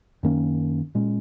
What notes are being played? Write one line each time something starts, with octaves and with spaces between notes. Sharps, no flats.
F#2 D#3 A#3 C#4
A#2 G#3 C#4